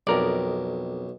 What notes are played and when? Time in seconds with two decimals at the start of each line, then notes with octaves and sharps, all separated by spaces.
0.07 B1 F2 A#4 D5